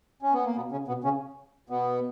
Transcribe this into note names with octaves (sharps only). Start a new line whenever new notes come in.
C#4
B3
A#3
B2 B3
C#3 C#4
B2 B3
C#3 C#4
B2 B3